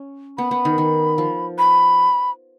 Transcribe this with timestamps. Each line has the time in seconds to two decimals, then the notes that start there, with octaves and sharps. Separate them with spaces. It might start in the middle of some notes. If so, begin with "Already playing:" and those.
Already playing: C#4
0.38 B3 B5
0.51 B3
0.65 D#3
0.78 D#3
1.18 F3
1.58 B5